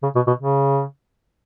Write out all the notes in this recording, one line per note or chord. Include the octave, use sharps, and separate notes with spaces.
C#3
B2
B2
C#3